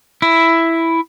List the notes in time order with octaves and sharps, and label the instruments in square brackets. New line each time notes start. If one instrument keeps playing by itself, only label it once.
[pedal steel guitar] E4